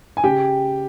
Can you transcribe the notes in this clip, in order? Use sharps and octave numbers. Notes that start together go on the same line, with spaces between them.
G#5
C#3 G4 G5